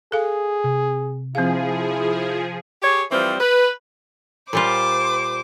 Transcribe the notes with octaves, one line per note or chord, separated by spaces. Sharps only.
G#4 A4 F5
C3
F3 C4 E4 G#4 F5
G4 G#4 C#5
E3 F3 G3 C4
B4
A#2 G3 F4 C5 D6